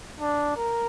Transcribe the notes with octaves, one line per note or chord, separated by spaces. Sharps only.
D4
A#4